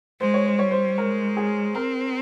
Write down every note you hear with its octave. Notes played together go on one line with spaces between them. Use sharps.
G#3 C5
C#5
C5
G3 C#5
C5
G#3 A#4
G#4
C4 A#4